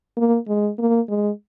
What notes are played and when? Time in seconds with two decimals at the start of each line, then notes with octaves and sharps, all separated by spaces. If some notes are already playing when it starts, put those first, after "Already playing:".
0.17 A#3
0.48 G#3
0.79 A#3
1.09 G#3